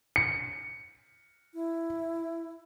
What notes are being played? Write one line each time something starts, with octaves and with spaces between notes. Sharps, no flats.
C#7
E4